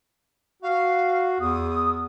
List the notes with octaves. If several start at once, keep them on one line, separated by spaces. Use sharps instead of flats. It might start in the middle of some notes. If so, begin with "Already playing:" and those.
F#4 F5
E2 D#6